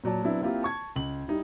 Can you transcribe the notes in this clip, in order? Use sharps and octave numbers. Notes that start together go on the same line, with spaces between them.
A#2 F#3 D5 A5
F#3 B3 C4 D4 E4
A#3 C4 E4 F4 G4
A5 C#6 G#6
C#2 F#7
G3 D#4 E4